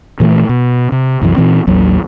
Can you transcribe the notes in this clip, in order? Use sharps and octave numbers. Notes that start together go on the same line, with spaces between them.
A#2 E3 G#3 A3
B2
C3
C2 F#2 E3
A#2 E3 C4
A1 D#2 F#3